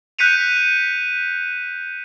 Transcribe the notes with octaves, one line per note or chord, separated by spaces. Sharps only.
F#6 G6 B6 C#7 D#7 F7